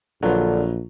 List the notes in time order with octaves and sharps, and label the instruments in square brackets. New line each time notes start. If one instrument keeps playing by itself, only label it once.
[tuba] A#1 [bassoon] D3 [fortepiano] F#3 F4 B4